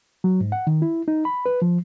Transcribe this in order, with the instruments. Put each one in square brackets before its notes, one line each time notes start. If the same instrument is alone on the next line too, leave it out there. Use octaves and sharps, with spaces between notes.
[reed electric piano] F#3
G#2
F#5
D#3
E4
D#4
B5
B4
F3